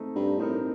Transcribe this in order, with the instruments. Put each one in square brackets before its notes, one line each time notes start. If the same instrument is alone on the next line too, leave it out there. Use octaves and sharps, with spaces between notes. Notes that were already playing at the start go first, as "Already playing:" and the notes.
Already playing: [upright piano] A3 C4 D#4
[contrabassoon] G2
[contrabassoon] A2 [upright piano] C4 D#4 A#4